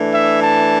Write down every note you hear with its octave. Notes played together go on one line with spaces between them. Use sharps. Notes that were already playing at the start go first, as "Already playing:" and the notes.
Already playing: E3 A3 D4
E5
A5